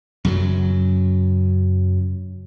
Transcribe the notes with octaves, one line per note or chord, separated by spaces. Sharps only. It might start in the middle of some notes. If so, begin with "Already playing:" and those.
F#2 C#3 F#3